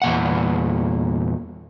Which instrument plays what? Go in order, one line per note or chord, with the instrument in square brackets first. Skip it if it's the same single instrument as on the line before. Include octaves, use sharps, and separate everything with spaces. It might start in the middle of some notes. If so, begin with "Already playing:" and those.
[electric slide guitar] E2 A#2 F#5